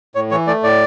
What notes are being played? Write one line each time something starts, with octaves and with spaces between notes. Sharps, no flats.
A2 C#5
E3 C#5
A3 D5
A2 D5